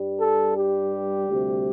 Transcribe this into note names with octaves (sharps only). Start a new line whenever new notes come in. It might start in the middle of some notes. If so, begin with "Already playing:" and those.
Already playing: G2 G3
A4
G4
D2 C3 G3